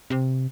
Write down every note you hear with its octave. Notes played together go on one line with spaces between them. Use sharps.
C3